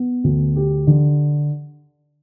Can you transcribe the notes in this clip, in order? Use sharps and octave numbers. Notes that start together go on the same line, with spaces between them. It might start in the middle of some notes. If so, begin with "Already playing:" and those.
Already playing: B3
D2
G4
D3